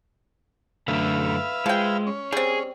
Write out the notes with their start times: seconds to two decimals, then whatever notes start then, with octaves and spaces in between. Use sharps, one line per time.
0.88 F#2 D3 A3 B4 E5 F5
1.66 F3 G#3 G5
2.07 C#4
2.33 G3 C4 G#4